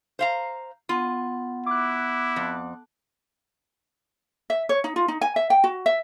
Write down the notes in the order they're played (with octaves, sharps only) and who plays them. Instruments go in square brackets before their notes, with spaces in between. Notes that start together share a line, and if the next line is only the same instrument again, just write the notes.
[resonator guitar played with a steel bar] C5 F5 A#5
[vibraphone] B3 F#5 [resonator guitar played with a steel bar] F4
[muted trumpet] E4 [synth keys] D6 F#6
[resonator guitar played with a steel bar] F2
[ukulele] E5
C#5
D#4
F4
D#4
G#5
E5
G5
F#4
E5